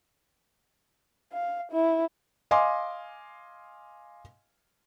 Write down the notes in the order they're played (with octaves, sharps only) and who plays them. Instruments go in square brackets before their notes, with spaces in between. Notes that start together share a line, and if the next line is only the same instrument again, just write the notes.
[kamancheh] F5
E4
[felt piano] D#5 F5 G#5 C6 D6